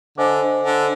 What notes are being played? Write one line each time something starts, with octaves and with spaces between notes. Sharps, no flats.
D3 C5 D#5 G#5 D6
D3